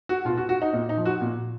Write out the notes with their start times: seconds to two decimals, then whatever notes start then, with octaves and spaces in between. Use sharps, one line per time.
0.09 F#4
0.25 B2 F4
0.37 F#4
0.49 F#4
0.62 D#4
0.73 A#2 D#4
0.89 D#4
0.97 F3
1.05 F#4
1.21 A#2